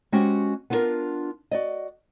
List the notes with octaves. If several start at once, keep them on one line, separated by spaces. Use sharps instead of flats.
G#3 C#4 F#4 G4 C5 G5
B3 D4 F4 G4 A#4
F#4 D5 D#5